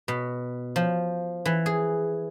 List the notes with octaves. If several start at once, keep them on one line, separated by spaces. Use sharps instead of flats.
B2
F3
E3
G#4